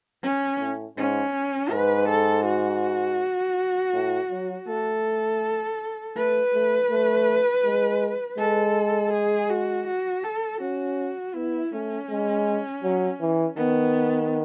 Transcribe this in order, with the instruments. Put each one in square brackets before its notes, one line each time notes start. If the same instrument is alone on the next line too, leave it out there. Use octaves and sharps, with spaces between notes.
[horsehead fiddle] C#4
[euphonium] A2
[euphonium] G#2 [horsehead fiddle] C#4
[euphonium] G#2 [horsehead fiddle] B4
[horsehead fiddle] A4
F#4
[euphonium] A2
F#3
[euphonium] A3 [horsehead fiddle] A4
[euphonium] A3 [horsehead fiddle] B4
[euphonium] A3
A3
G#3
[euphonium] G#3 [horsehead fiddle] A4
[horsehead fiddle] G#4
F#4
F#4
A4
[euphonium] C#4 [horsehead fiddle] F#4
[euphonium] B3 [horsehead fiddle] E4
[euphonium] A3 [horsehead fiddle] C#4
[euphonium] G#3
F#3
E3
[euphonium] D#3 [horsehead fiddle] B3